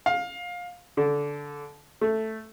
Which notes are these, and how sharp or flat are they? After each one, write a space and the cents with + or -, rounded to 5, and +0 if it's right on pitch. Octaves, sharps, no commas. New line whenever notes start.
F5 +20
D3 -20
A3 +0